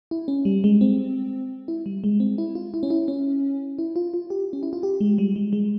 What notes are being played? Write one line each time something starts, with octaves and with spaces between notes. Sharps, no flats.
E4
C#4
G3
G#3
C4
E4
G3
G#3
C4
E4
F4
E4
C#4
E4
C#4
E4
F4
F4
G4
C#4
E4
F4
G4
G#3
G3
G#3
G#3